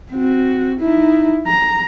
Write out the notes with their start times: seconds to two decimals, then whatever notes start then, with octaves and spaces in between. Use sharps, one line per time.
0.11 C4 F#4
0.80 D#4 E4
1.47 A#5